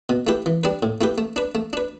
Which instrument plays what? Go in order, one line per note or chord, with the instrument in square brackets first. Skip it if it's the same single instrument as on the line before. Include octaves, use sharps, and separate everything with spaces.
[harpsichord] B2
A3 E4 G4 B4
E3
G3 D4 B4
A2
A3 E4 G4 B4
A3
D4 B4
A3
D4 B4